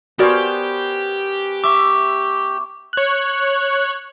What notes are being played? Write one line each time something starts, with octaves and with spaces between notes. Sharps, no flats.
B3 C#4 F#4 G4 A#4 C5 D5
E5 C#6 D6
C#5 F#6